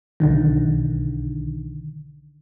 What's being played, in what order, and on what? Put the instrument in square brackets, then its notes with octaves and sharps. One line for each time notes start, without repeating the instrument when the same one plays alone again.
[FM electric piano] B1 D3 D#3